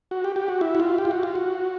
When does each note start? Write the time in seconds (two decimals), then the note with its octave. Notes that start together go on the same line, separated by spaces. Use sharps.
0.11 F#4
0.24 G4
0.36 G4
0.48 F#4
0.61 E4
0.75 F#4
0.80 F4
0.98 G4
1.05 F4
1.11 F#4
1.23 F4
1.35 F#4